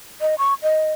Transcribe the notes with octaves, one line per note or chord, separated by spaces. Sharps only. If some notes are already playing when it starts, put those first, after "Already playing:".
D#5
C#6
D#5